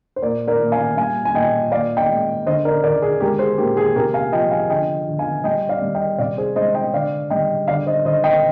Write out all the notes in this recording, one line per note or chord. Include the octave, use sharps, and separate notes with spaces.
C5
A#2 A#4 D5
A#4 D5
A#2
F5 G#5
G3 F5 G#5
G#5
A#2 D#5 G5
A#2 D5 F5
D#5 G5
G#3
D3 C5 D#5
A#4 D5
D3 A#4 D5
G#4
G#3 G4 A#4
G#4 C5
A#2 G4 A#4
G#4
C3 G4 A#4
F5 G#5
F3 D#5 G5
F5 G#5
D3 D#5 G5
D3
F5 G#5
G3 D#5 G5
D5 F5
G3
D#5 G5
C3 D5 F5
G#4 C5
G#3 C5 D#5
D#5 G5
D3 D5 F5
G3 D#5 G5
D3 D5 F5
C5 D#5
D3 C5 D#5
D#5 G5